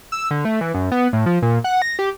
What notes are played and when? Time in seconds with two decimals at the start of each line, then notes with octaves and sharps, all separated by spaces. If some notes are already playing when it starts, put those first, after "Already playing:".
0.12 E6
0.31 D3
0.45 A3
0.61 E3
0.74 F#2
0.92 B3
1.13 A2
1.26 F3
1.42 A#2
1.64 F#5
1.82 A#6
1.99 G4